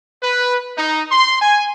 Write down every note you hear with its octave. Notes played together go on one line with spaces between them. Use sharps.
B4
D#4
C6
G#5